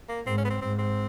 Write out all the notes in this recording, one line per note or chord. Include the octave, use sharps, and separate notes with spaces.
A#3
G#2 C4
C#4
B3
C4
G#2 C4
C4